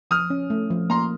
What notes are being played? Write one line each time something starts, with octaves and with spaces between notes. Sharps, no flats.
F3 D#6 F6
C#4
A3
F3
A#3 A#5 C6